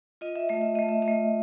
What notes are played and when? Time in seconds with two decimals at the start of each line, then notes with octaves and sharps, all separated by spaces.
0.21 F4 D#5
0.36 E5
0.49 A3 D#5
0.62 E5
0.75 A3 D#5
0.89 E5
1.02 D#5
1.08 A3